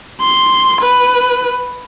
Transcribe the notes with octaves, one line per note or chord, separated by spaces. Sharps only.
C6
B4